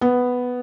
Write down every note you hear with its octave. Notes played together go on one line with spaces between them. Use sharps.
B3